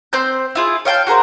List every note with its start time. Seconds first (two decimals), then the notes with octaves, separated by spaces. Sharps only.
0.13 C4 C5 G6
0.55 E4 F4 G#4
0.85 C#5 F5 G5 A5
1.07 F#4 G#4 A#4 C5